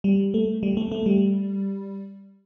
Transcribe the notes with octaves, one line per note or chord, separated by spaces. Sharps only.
G3
A3
G3
A3
A3
G3